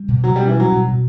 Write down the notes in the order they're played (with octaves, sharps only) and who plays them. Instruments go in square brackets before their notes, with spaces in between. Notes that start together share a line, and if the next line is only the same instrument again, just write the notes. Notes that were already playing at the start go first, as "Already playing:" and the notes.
Already playing: [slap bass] G3
B2
[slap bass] B2 [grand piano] F#3
[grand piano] G3
[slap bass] C#4
[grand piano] E3
[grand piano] F#3 [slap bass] G3
[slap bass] B2
B2